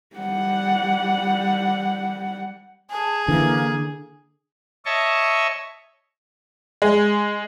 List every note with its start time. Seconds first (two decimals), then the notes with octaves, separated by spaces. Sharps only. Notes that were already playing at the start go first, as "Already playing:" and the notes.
0.16 G3 F#5
2.91 G#4 A5
3.28 D3 E3 A#3
4.86 C#5 D#5 E5 A5 C#6
6.82 G#3